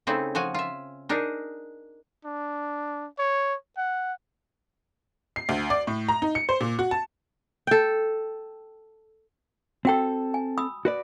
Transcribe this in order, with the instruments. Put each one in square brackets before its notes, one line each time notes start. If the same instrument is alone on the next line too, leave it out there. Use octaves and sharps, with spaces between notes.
[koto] C#3 A3 C4 D#4 E4
F3 F#4 G#5
F4 E5
D4 D#4 G#4 A#4
[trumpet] D4
C#5
F#5
[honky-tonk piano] C7
D2
D5
A2
A#5
D#4
C#7
C5
A#2
F#4
A5
[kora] A4 G5
[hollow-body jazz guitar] C4 A4 [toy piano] F#4 G5 E6
[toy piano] G#5
B5 D#6 E6
[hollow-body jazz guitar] F#4 B4 D5